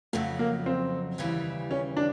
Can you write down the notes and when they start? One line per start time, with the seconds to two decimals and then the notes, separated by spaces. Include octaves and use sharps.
0.13 F2 C#3 F#3 A3
0.39 A#3
0.66 C4
1.18 D#2 C#3 E3 G3
1.71 C#4
1.97 D4